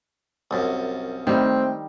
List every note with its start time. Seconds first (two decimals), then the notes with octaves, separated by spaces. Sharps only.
0.51 C2 F#2
1.27 D#3 G3 A3 C4